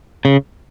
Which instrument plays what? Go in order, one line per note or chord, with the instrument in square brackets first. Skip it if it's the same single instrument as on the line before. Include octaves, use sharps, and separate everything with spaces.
[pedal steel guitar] C#3